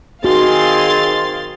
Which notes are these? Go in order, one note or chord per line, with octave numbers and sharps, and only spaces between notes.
D#3 C4 F#4 G#4 F5 C6 A6